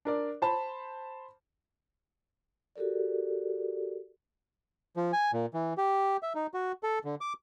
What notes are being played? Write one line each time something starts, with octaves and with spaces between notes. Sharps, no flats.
D4 A#4 D5
C5 A5 B5 C6
F#4 G4 A4 A#4 D5
F3
G#5
A#2
E3
G4
E5
D#4
F#4
A4
D3
D6